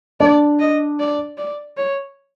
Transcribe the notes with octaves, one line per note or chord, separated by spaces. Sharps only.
D4 D5
D#5
D5
D5
C#5